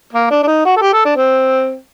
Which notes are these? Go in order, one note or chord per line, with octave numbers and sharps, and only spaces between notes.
A#3
D4
D4
D#4
F#4
A4
G4
A4
D4
C4